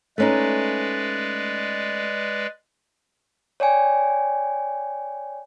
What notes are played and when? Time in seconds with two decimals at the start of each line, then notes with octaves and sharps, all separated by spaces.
0.18 G#3 A3 C#4 D#4 B4 D5
3.60 C#5 D5 G5 G#5